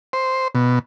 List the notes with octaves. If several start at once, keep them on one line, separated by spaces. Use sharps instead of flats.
C5
B2